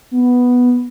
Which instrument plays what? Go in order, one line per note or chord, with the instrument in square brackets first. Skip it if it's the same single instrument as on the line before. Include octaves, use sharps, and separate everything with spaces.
[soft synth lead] B3